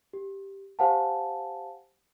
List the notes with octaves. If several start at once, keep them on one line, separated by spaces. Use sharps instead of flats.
G4
G4 C5 F5 F#5 G#5 A5